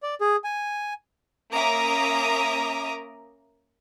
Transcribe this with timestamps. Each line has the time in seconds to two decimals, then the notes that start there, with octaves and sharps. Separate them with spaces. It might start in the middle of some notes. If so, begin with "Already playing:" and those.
0.03 D5
0.21 G#4
0.44 G#5
1.52 A#3 C#4 E5 A#5 D6 D#6